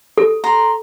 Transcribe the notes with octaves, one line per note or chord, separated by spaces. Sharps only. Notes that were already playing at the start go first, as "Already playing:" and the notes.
A4
A#5 C6